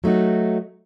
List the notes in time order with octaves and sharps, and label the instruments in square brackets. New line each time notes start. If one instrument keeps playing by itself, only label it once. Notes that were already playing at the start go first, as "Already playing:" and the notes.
[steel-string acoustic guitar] F#3 A3 D#4 F#4